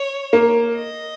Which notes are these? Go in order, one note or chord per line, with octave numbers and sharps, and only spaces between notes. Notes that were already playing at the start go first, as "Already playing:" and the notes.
Already playing: C#5
A#3
D#5